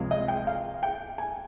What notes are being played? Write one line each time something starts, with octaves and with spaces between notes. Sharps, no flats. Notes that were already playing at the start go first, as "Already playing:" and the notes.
Already playing: C#2 C3 F3 G#3
D#5
G5
F5
G5
G#5